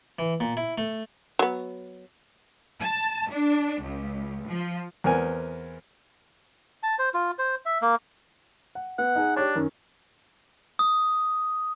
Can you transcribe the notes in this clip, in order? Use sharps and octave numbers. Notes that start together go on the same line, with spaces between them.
E3
A#2
E4
A3
F#3 B3
A5
D4
C#2
F3
E2 B3 C4 A#4 G#5
A5
C5
F4
C5
E5
A#3
F#5
B3 F#5
D#4 G#4
D4 G4 C#5
F#2 D#3 C#4
D#6